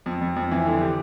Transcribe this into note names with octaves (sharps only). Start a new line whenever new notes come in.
F2
F2
F2
E3
D3
G4